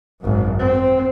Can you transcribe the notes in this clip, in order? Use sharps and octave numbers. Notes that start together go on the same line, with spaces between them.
G#1 F#2
C4